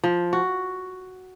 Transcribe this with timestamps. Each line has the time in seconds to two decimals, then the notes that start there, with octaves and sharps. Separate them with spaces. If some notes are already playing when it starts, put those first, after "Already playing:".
0.04 F3
0.33 F#4